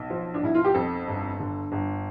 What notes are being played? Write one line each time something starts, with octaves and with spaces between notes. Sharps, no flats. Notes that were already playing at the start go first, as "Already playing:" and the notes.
Already playing: B1
F3
D4
B1 E4
F4
G4
F2 A4
G1
D3
G1